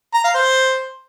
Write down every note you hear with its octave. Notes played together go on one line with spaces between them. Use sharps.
A#5
F5
C5